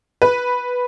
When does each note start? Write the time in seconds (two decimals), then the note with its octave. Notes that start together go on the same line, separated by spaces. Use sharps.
0.22 B4